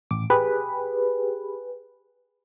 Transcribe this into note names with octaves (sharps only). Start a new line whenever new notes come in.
A1 D6
G4 G#4 B4